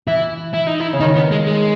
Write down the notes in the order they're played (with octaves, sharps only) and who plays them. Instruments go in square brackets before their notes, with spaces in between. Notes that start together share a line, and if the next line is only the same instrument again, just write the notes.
[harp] E3 [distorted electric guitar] E4
[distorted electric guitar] E4
D#4
E4
[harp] C#3
[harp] D#3 [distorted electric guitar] D#4
[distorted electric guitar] B3
G#3
G#3